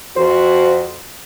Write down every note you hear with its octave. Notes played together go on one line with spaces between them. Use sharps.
F2 F#4 C5